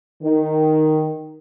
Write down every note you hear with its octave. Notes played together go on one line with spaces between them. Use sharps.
D#3